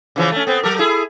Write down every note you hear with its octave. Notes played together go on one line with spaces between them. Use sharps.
C#3 E3 F3
A3 C#4
B3 C4
F#3 A4 A#4
E4 G#4